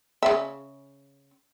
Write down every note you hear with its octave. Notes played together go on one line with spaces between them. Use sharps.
C#3 E5